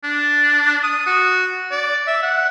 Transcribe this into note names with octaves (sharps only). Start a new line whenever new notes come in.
D4
D#6
F#4
D5
E5
F#5